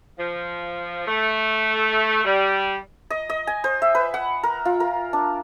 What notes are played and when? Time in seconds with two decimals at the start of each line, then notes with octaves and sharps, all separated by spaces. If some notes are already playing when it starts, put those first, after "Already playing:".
0.19 F3
1.08 A3
2.25 G3
3.10 D#5
3.29 D#5
3.47 G#5
3.64 C5
3.82 E5
3.95 B4
4.14 F#5
4.43 A#4
4.65 F4
4.80 A#4
5.13 D4